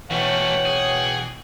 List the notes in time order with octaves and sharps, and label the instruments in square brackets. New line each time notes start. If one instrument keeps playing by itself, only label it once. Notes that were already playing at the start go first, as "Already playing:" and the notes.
[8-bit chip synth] B2 E3 [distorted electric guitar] A3 C#4 [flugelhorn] C#5 [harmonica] F#5 G5
[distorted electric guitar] G#4